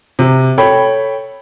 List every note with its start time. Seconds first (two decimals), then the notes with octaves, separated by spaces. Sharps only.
0.19 C3
0.58 A4 C#5 G5 B5